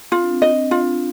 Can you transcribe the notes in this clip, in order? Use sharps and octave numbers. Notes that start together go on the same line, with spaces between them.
C4 F4
D4
C4
D#5
C4
D4 F4
C4